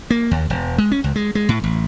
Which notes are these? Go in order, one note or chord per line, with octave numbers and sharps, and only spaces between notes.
A#3
D#2
E1
G#3
C#4
C#2
G#3
G#3
A2
A1